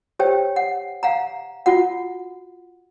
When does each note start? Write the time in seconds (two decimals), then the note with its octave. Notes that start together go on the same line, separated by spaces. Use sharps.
0.19 G4 C5 C#5 G5
0.56 F#5
1.03 F5 F#5 A#5
1.66 F4 F#4 F#5